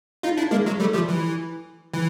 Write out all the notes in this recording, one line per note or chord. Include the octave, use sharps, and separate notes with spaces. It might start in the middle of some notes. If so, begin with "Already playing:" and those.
D#4 F4
D4 E4
G#3 A#3
F#3 G#3
G3 A3
F3 G3
E3
E3